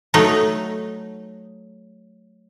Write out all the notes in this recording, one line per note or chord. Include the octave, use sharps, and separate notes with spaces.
F#3 A3 D#4